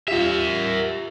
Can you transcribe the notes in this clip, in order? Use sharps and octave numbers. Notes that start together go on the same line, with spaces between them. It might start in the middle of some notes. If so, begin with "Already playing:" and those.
F4 G4 A#4 E5